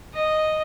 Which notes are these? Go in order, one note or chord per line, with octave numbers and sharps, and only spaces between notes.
D#5